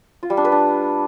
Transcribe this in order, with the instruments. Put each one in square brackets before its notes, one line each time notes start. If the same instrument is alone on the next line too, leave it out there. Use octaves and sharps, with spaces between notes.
[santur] F4
G3
D4
B4
D4